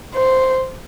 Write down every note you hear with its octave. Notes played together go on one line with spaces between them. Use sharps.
C5